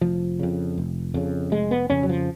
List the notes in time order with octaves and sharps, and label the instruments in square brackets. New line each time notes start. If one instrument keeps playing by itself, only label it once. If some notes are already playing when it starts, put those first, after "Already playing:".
[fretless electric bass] F1 F3
F2 C#3
F1
F2 C#3
F1 G#3
B3
F2 C#3 C#4
F#3
F3